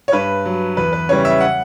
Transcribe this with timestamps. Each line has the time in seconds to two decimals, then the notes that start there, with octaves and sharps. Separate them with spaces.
0.08 C#5
0.12 G2 B4
0.45 F#3
0.77 E2 B4
0.93 B4
1.09 C#3 E3 G3 C#5
1.25 E5
1.40 F#5